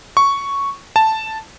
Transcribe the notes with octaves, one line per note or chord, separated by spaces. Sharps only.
C#6
A5